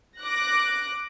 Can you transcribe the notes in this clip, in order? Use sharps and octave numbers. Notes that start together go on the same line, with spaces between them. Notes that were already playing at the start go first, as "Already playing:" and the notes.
D6 F#6 A#6